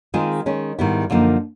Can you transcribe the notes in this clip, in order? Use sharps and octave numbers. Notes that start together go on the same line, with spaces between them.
D#3 G#3 C4 F4 G#4
D#3 G#3 C#4
G#2 D#3 G3 B3 E4
F#2 D3 F3 A#3 D#4